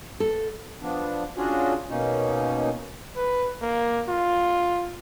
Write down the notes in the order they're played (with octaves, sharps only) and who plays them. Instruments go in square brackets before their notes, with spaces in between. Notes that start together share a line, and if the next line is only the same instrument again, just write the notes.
[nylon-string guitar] A4
[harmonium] F3 B3 D4
C#4 D4 F4 F#4 G#4
B2 A#3 C#4 D#4
[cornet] B4
A#3
F4